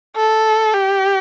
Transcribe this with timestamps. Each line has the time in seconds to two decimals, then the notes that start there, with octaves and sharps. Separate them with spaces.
0.16 A4
0.74 G4